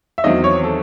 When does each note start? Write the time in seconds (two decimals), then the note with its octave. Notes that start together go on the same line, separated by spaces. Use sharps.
0.18 E5
0.24 E2 D#3 F#3 C4 D#5
0.44 C#5
0.63 A4